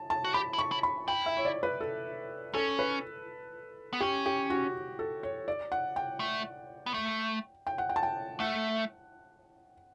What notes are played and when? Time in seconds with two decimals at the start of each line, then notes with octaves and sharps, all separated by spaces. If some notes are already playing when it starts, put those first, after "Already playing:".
Already playing: A5
0.10 A5
0.24 F#4
0.34 G4 B5
0.53 E4
0.58 C#6
0.71 E4
0.83 B5
1.08 E4 G5
1.26 E5
1.37 C#5
1.45 D5
1.63 B4
1.81 A4
2.54 C#4 A4
2.79 B4
3.93 B3
4.00 C#4 G4
4.26 G4
4.50 F#4
4.99 A4
5.23 C#5
5.48 D5
5.72 F#5
5.96 G5
6.20 A3
6.86 B3
6.94 A3
7.67 G5
7.78 F#5
7.89 G5
7.96 A5
8.03 G5
8.40 A3 F#5